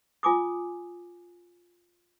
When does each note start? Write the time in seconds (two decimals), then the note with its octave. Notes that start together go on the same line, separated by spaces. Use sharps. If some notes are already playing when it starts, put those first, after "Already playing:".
0.23 F4 G#5 D6 D#6